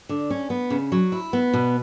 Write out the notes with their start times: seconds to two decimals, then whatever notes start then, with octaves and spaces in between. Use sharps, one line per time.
0.09 D3
0.30 C#4
0.50 B3
0.70 C#3
0.92 F#3
1.12 E4
1.33 B3
1.53 B2